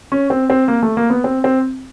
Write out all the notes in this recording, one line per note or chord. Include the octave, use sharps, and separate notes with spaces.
C#4
C4
C4
A#3
A3
A#3
B3
C4
C4